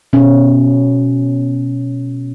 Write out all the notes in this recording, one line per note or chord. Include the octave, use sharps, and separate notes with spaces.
B2 C#4